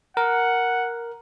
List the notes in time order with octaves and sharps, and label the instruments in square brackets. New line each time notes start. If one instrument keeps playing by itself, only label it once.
[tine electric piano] A#4 [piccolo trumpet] F#5